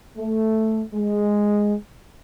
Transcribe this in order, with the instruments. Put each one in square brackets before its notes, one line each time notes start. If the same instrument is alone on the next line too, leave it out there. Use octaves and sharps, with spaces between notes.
[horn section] A3
G#3